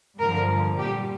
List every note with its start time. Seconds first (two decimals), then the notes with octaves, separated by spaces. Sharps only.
0.20 G2 D3 F3 A#4
0.78 A#2 G4
0.82 G3